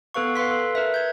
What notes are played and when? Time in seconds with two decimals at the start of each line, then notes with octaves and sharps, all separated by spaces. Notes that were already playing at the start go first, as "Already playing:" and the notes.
0.14 B3 A4 B4 F5 C#6
0.35 B4 F5 C6 B6
0.51 A4
0.75 A#4 B4 E5
0.94 G6 G#6